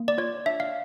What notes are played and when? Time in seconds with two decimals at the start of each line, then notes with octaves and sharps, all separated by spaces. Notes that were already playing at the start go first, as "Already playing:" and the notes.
Already playing: A#3
0.08 D5
0.18 F4 C#5
0.46 D4 E5
0.60 F5